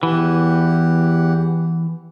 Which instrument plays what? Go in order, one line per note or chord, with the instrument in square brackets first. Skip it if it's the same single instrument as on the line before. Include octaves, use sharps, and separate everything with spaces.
[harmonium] E2 G4 F#5 [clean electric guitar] E3